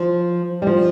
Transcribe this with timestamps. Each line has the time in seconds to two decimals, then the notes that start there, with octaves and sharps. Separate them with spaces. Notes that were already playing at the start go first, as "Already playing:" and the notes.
Already playing: F3
0.62 G3
0.67 F3